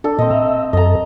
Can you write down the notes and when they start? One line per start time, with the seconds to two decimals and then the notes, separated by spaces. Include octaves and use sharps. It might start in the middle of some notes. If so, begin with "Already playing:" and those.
0.04 D4 A4
0.19 A#2 C4 D#5
0.30 E5 A#5
0.73 F#2 A4 D#5 A#5